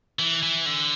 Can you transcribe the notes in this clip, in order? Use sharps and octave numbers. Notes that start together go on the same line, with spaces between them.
E3
E3
D3